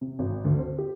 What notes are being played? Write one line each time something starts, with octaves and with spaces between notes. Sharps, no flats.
C3
G#1
D2
C4
G4